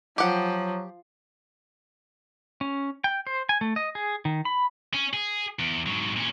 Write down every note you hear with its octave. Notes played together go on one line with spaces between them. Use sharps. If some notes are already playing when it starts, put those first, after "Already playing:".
F3 F#3 G4 F#5
C#4
G5
C5
G#5
A3
D#5
G#4
D#3
B5
C#4
G#4
E2
G#2 F#3
A#2 C#4